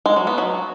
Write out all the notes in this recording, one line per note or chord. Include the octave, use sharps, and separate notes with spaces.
G#3
F#3
B3
F#3